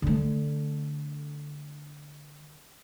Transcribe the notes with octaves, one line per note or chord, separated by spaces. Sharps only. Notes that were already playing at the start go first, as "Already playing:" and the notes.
D3 A3